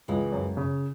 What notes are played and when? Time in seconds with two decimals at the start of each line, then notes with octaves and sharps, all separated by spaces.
0.08 C#2 E3 G#3
0.32 F#2
0.57 C#3